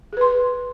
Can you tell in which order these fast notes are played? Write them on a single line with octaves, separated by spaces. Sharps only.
G#4 B4 C6